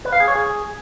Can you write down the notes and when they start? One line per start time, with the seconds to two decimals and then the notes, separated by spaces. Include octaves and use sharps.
0.05 B4
0.13 F5
0.20 G#4
0.28 C#5
0.35 G#4